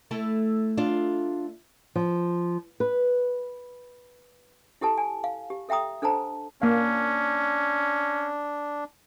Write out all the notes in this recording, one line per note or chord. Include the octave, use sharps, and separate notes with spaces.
A3 E4 A4
D4 F4
F3
B4
E4 G4 A4 A5
G#5
F5
G4
A4 E5 G5 A#5 D#6
D4 A4 C5 A5 A#5
A#3 C#4 D4 F5